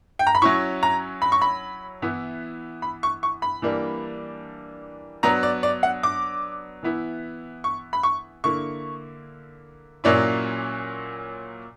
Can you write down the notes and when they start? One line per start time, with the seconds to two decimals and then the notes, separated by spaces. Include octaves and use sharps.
0.19 G5
0.27 A#5
0.35 B5
0.42 F#3 C#4 E4 C#6
0.83 A#5
1.22 B5
1.32 C#6
1.42 B5
2.02 E3 B3 E4
2.82 B5
3.03 C#6
3.23 C#6
3.42 B5
3.62 E3 G3 A#3 D4
5.23 F#3 B3 D4 A#5
5.43 D5
5.63 D5
5.83 F#5
6.03 D6
6.83 E3 B3 E4
7.64 C#6
7.93 B5
8.03 C#6
8.44 D3 A#3 E4 C#6
10.04 A#2 F#3 A#3 C#4 E4 D5